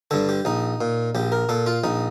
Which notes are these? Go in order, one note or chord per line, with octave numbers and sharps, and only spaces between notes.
G2 D3 A4
G4
A#1 D#4
A#2
A#1 G4
A#4
A#2 A4
F4
A#1 D#4